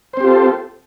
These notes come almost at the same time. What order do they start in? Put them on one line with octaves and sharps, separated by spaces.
C5 C4 G4 F4 A4